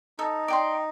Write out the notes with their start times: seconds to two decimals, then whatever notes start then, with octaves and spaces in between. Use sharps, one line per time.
0.19 D#4 A4
0.48 D5 G5 C6